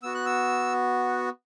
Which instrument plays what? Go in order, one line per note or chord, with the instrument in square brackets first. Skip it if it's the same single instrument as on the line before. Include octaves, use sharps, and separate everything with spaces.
[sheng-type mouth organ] B3 F#4 E6
F#6
E6